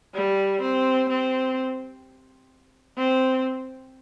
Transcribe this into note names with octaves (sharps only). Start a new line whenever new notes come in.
G3
C4
C4
C4